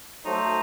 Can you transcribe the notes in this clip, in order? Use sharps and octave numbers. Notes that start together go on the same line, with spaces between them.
F#3 A3 D#4 A4 C5